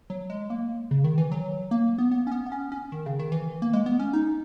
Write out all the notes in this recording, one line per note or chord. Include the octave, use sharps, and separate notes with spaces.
F#3
G#3
A#3
C#3
D#3
E3
F#3
A#3
B3
B3
C#4
B3
B3
C#4
C#4
D#3
C#3
D#3
E3
A#3
G#3
B3
C#4
D#4